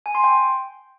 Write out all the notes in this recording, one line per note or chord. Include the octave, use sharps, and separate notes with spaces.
G#5
C6
G5